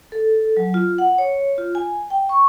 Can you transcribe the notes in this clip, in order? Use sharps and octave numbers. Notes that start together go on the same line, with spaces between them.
A4
F#3
F4
F#5
C#5
F4
G#5
G5
C#6